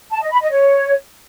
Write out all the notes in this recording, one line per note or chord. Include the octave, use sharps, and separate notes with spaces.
A5
D#5
B5
D#5
C#5